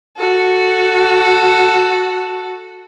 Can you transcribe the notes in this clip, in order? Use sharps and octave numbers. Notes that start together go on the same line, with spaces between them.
F#4 A4